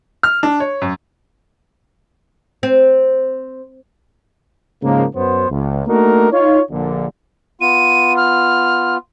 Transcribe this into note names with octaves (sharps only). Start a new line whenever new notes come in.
F6
D4
C#5
F#2
C4
G#2 C#3 F3 G#3 A#3
F#2 B3 C5
C#2
A3 A#3 D4 D#4 F#4 A#4
D#4 F4 C#5
A#1 A#2 D3
B3 F4 D#7
F6